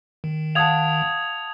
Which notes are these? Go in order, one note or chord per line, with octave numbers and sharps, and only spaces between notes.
D#3
F5 F#5 A5 D#6 G#6 F7